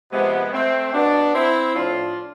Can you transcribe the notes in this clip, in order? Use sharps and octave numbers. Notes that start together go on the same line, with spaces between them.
C3 F3 G#3 B3
A3 C4
B2 B3 D4
C4 E4
A2 F3 D4 F4